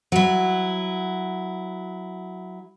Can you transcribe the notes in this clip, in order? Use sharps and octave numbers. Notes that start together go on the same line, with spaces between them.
F#3 E4